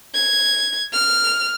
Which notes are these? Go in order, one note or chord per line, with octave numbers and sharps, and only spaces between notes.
G#6
F6